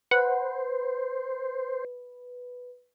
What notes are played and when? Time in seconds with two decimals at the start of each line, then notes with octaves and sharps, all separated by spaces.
0.11 B4 C5 F#5